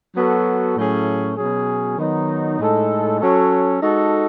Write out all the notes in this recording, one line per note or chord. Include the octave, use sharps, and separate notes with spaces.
F#3 B3 F#4 A4
A2 F#3 A3 C#4 G#4
B2 F#3 C#4 G#4
D#3 F#3 B3 D#4
A2 G#3 D#4 A4
F#3 C#4 F#4 A4
G#3 D#4 F#4 A4